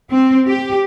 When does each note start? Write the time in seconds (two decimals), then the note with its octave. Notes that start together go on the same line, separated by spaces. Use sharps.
0.11 C4
0.47 G4